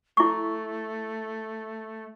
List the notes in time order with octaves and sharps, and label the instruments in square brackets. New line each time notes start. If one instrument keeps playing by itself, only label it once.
[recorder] A3 [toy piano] E4 C#6